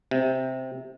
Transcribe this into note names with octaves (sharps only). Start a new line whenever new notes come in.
C3